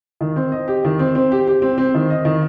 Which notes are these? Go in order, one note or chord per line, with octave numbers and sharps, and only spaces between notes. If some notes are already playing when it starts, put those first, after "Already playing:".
D#3
C4
D#5
G4
D#3
C4
C4
G4
G4
C4
C4
D#3
D#5
D#3